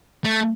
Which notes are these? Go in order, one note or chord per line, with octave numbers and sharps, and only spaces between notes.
A3